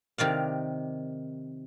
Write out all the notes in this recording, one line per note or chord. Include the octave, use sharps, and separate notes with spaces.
C3 D#3 D5 F5